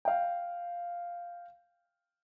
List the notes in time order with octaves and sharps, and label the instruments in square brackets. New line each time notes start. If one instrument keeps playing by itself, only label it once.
[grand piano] F5 G5